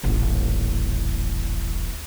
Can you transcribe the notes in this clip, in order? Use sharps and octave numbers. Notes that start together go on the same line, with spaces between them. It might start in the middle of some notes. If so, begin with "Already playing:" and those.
D#1 A1